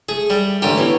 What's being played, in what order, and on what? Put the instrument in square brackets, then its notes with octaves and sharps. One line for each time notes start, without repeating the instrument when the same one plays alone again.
[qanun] A3 [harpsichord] G#4
[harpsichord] G3
[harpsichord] A1 D3 G4 [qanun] A#4
[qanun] E3 B3 C#5